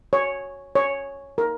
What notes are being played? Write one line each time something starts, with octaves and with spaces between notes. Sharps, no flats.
C#5
C#5
A#4